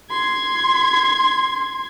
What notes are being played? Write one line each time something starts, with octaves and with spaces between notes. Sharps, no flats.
C6 G#6